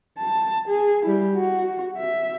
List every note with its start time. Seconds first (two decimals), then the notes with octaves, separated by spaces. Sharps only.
0.19 A5
0.69 G#4
1.06 G3 E4
1.34 F#4
1.98 E5